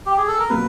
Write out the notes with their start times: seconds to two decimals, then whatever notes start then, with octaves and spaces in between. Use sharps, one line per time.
0.06 G4
0.17 G#4
0.28 A4
0.39 A#4
0.50 B2 F#3 A#3 B4